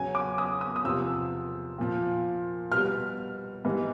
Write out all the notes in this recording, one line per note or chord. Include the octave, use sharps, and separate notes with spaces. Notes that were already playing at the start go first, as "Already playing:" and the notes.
Already playing: E2 C#3 F#3 G#5
D6
D#6
D#6
D#6
E2 C3 F3 E6
A#2 F3
B2 G3 F6
G#2 E3 G3